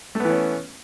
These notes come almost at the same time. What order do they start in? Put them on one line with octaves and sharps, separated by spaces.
A3 B3 E3 C#4